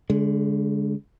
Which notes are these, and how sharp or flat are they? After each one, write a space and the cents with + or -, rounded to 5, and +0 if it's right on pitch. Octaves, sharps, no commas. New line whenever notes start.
D3 -35 G#3 +0